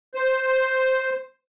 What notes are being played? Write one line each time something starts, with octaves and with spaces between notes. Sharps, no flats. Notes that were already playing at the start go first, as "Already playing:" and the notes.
C5